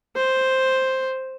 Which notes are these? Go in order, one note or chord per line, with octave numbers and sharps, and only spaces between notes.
C5